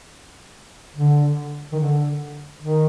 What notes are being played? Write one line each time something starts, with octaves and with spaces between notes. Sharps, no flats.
D3
D#3
D3
D#3